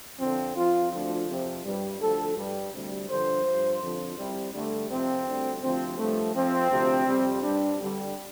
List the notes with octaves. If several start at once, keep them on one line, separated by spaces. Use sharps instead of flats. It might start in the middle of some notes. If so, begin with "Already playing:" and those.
F2 D3 F3 C4
F2 F3 F4
D2 D3 F3
F2 C3 F3
G2 G3
D2 D3 F3 A4
G2 G3
D2 C3 G3
G2 D3 F3 C5
F3
G2
F2 D3 F3
C2 C3 G3
G2 D3 G3 A3
F2 C3 F3 C4
D2 D3 G3
D2 C3 F3 C4
G2 F3 A3
F2 F3 C4
D2 C3 F3
F2 C3 G3
G2 G3 D4
G2 D3 G3